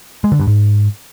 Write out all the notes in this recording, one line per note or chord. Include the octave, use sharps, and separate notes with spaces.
G#3
D3
G2
G#2